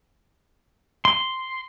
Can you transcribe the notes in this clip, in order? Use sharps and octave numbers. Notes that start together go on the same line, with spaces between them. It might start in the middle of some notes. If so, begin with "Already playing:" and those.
C6